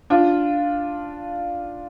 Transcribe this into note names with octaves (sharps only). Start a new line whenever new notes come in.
D4 F4